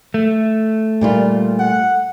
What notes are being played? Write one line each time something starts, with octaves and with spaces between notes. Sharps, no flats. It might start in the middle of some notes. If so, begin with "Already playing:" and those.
A3
A#2 G3 F4
F#5